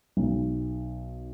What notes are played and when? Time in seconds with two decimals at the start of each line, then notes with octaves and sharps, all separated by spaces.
0.17 B1